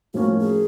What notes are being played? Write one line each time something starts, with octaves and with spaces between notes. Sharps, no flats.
A2 F3 A#3 C#4 F#4
G#4